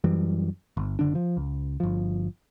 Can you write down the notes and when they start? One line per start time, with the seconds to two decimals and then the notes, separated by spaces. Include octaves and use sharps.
0.04 F#2 E3 G3
0.77 G1
0.99 F#1 D3 D4
1.15 F3
1.37 C#2
1.80 G1 F3